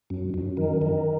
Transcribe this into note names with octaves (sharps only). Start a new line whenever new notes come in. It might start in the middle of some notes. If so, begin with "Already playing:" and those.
F#2
F#2
D#3
D#3